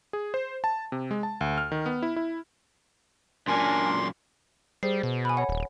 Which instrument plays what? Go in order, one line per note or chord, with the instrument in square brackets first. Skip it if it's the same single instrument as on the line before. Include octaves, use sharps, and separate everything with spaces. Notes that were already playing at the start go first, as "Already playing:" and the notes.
[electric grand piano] G#4
C5
A5
C3
G#3
A5
D2
F6
D#3
B3
E4
E4
[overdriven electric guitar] F#2 A#2 [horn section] D4 A#4 [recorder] G#5 [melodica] C6
[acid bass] G3 [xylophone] G#4 C5 C7
[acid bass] B2
[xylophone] G#5 B5
C#5 F#5
[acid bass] D#1